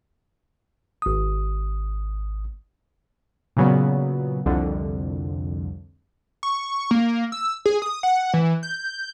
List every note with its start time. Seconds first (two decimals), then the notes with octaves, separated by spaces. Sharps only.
1.02 G#1 D#6
3.57 A#2 C#3 F#3 B3
4.45 C2 F2 D3
6.43 C#6
6.91 A#3
7.32 E6
7.66 G#4
7.82 D#6
8.03 F#5
8.34 E3
8.63 G6